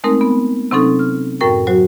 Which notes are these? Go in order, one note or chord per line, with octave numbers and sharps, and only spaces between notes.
G#3 A3 C4 D#4 A#4
B3
C3 F#3 C4 C#4 D#4 A4
F6
F#2 A2 A#4 G5 C#6
F#3 F#4 C5